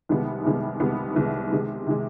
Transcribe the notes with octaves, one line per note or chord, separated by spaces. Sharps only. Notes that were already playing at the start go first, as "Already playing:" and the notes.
C2 C3 D#3 G#3 B3
C2 C3 D#3 G#3 B3
C2 C3 D#3 G#3 B3
C2 C3 D#3 G#3 B3
C3 D#3 G#3
C3 D#3 G#3